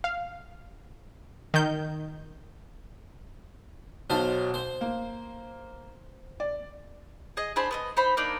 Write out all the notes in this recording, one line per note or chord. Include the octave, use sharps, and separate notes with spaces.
F5
D#3 G6
B1 B2 F#3 C5 F5 A5
C5
A#3
D5
G#4 D#5
D4 G#4 C5 B5
B3 B4 D#5
D#4 C5 B5
A#3 D4 D#4 D5